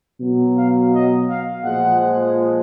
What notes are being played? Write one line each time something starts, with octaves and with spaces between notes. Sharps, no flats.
B2 F#3
F5
D#5
F5
A#2 F3 G#3 F#5